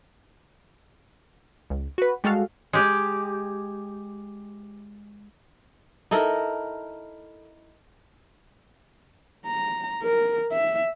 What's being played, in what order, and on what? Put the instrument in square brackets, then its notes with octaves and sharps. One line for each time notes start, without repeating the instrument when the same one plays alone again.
[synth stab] C#2
F#4 B4
G3 G#3 F#4 A4 F5
[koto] G#3 G4
[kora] D#4 E4 A4 A#4
[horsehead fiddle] A#5
A#4
E5